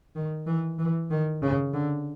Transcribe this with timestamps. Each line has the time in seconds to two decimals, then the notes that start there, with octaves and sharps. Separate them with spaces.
0.15 D#3
0.47 E3
0.79 E3
1.10 D#3
1.42 C#3
1.74 D3